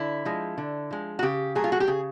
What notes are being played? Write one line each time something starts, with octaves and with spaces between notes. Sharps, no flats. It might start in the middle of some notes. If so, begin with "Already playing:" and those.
Already playing: D3 E4
F3 G#3
D3
F3 G#3
F#4
C#3 G4
F#3 A3 G#4
F4
F#4
G4
C#3 G#4